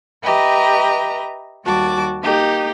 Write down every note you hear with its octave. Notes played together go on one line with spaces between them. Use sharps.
G4 B4 D#5 E5 A#5
D#2 G3 F#4 A5 D6
A#3 D#4 G4